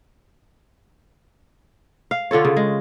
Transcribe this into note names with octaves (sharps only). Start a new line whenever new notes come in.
F5
D3 F4 A4 C#5
C#3
G#3